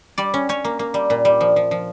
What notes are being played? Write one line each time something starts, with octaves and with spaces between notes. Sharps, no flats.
G3 D5
C#4
C#4 C#5
A#3
A#3
G3
A#2
G3
F3
F3
F3